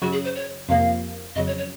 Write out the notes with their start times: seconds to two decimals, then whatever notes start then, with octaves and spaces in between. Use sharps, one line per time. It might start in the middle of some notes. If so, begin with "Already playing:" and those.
0.02 F#2 C#3 F#3 F#4
0.12 G#4
0.24 C5
0.35 C#5
0.69 F2 C3 F3 A#3 F5
1.36 F2 C#3 F#3 D#5
1.47 C#5
1.58 C#5